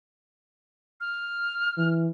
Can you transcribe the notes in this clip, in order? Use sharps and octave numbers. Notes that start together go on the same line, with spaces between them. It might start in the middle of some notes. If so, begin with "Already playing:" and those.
F6
E3